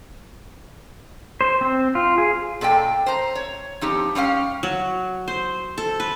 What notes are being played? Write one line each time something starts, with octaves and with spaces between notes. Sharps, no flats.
C5
C4
F4
G#4
A#2 A4 D#5 G5
C5 A#5
C#5
F2 D#4 G4
G3 C#4 C5 F5
F#3
C5
A4
B4